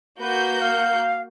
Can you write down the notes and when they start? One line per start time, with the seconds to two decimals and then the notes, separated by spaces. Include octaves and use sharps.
0.20 A#3 F#4 B4 G6
0.61 F5